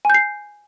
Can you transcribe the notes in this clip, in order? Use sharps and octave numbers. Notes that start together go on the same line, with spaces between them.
G#5 G6 C7